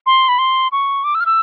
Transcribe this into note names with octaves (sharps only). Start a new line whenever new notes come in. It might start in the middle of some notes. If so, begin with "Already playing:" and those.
C6
B5
C6
C#6
D6
E6
F6
E6